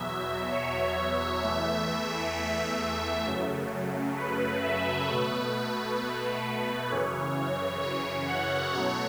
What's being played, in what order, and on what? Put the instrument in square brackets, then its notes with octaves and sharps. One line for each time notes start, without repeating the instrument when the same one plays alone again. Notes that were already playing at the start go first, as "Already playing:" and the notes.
Already playing: [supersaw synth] E2 B2 F#3 E5
C#5
E2 E3 A3 E5
F#2 C#3 F#3 A3
B4
E5
B2 A3 B4
F#2 C#3 E3 C#5
C#5
F#5
B2 F#3 A3 C#5